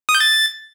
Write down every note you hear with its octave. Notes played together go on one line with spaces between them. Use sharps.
D#6
G6
A6